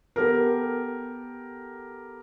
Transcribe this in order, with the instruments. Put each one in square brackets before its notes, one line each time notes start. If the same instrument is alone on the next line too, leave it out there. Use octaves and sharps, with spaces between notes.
[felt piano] B3 G4 A4 A#4